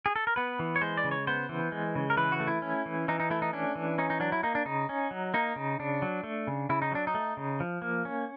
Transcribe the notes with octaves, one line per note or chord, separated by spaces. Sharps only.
G#4
A4
A#4
B3 B4
E3
C#5
G#3 C5
D5
C#3
C#5
B3 C5
E3
G#3
C#3
A#4
E3 B4
F#4
A3
E4
C#4
E3
E3 D#4
D#4
A3 E4
D#4
C#4 D4
E3
C#4 D#4
D#4
F#3 D4
E4
A#3 D#4
D4
C#3 D#4
C#4
F#3
A#3 D#4
C#3
C#3 D4
F#3
A3
C#3
C#3 E4
D#4
F#3 D4
D#4
A3
C#3
F3
A#3
C#4